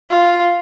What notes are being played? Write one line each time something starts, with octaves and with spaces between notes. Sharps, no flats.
F4